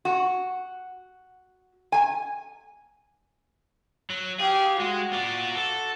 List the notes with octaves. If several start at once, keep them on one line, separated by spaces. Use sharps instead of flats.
F#4
G#5
F#3
G4 G#4 F5
G#3 F#4
F4 D5
A4